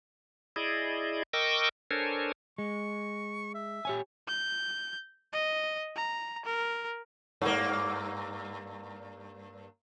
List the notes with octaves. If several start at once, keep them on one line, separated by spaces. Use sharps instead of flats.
E4 G#4 D5 D#5
A#4 D#5 G5 C#6 D6 E6
D4 A4 A#4 C5 C#5 G#5
G#3 C#6
E5
G4 C#5 G#5
G6
D#5
A#5
A#4
G2 A#3